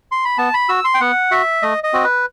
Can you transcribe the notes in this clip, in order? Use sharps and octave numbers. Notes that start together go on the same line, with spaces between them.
C6
B5
B3 A5
B5
F#4 E6
C6
G5
B3 F#5
F#4 E5
A3 D#5
D#5
C4 F#4
B4